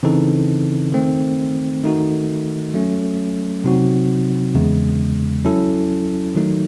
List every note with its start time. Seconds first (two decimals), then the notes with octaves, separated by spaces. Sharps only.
0.03 C#3 E3 C4 D#4 A4
0.92 D#3 A3 C4
1.83 D#3 A3 D#4 F#4
2.74 F#3 A3 C#4
3.64 C3 F#3 C4 D#4 F#4
4.55 E2 C#3 G#3
5.45 F#3 C#4 E4 A4
6.35 D#3 F#3 A3 D#4